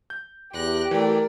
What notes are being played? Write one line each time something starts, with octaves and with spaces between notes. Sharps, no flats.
G6
E2 G4 G5 F#6 A#6
E3 A3 A#4 D5